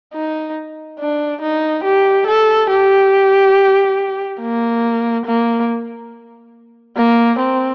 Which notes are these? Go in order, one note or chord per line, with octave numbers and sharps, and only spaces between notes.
D#4
D4
D#4
G4
A4
G4
A#3
A#3
A#3
C4